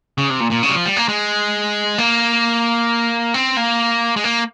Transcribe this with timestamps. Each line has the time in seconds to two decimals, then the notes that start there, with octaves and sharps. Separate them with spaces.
0.18 C#3
0.30 C3
0.40 A#2
0.51 A#2
0.63 C#3
0.70 G3
0.75 F3
0.86 G3
0.96 A#3
1.08 G#3
1.98 A#3
3.34 C4
3.57 A#3
4.16 G#3
4.24 A#3